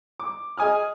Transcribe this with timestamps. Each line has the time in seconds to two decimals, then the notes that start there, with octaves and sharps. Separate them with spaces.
0.20 D6
0.57 G#4 D#5 G#5 D#6 F6